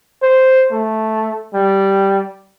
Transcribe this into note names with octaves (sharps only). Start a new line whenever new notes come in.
C5
A3
G3